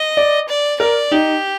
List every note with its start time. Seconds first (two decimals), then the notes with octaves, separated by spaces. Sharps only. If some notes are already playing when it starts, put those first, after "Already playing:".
Already playing: D#5
0.17 D5
0.49 D5
0.80 A#4 D5
1.11 D#4 G4